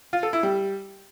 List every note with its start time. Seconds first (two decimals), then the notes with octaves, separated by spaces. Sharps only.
0.13 F4
0.23 A4
0.33 E4
0.43 G3